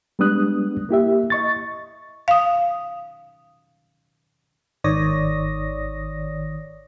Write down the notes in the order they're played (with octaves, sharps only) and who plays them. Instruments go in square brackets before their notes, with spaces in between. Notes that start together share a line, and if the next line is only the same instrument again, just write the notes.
[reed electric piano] G3 G#3 B3 D4 D#6 F#6
A#3 E4 G4 E5
D#5 C#6 A6
[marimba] F5 D#6
[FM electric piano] G#1 D#3 C#5 D5 D#6 A#6